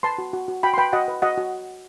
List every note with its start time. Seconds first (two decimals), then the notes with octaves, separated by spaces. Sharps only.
0.03 B4 A5 C6
0.18 F#4
0.33 F#4
0.48 F#4
0.63 F#4 G5 B5
0.74 C6
0.78 B4 G5 B5
0.93 F#4 D#5 F#5
1.08 B4
1.22 F#4 D#5 F#5
1.38 F#4